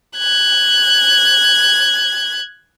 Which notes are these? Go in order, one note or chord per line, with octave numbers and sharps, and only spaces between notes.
F#6 G#6